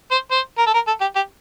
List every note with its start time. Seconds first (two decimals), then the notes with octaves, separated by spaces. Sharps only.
0.11 C5
0.31 C5
0.58 A#4
0.66 A4
0.74 A#4
0.87 A4
1.01 G4
1.15 G4